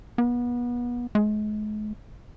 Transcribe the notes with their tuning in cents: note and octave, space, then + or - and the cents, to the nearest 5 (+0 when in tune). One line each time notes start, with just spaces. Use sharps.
B3 -30
G#3 +40